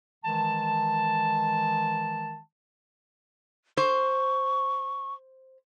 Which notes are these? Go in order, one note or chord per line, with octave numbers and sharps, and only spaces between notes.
D#3 E3 G#3 A5
C5 C#6